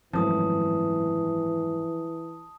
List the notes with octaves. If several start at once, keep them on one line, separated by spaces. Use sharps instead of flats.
G#1 F#2 A2 E3 F3 A5 D#6